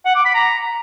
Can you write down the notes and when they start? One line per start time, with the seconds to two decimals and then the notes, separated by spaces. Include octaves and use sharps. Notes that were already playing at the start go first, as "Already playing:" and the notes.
0.06 F#5
0.15 D6
0.25 B5
0.35 A#5